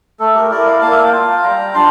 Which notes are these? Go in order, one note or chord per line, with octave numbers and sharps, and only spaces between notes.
A3 A4
G4 A#4
E4 A#4 D5
D5 F5
A#3 F5 A5
E5
F5
G5
F4 F5 A5
G3 G5 A#5
D4 F4 A5 C6